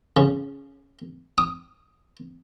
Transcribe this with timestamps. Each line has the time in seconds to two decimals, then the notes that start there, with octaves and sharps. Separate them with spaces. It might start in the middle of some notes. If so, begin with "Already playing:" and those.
0.17 C#3
1.38 D#6